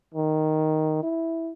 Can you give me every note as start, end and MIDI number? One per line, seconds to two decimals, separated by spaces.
0.14 1.02 51
1.03 1.52 64